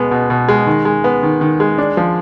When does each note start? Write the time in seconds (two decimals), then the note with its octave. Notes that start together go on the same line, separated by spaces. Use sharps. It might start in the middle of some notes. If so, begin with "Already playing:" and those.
Already playing: B2 G#3 B3
0.11 B2
0.30 B2
0.49 G#3
0.67 D#3
0.85 G#3
1.04 B3
1.23 D#3
1.41 D#3
1.60 G#3
1.78 D4
1.97 F3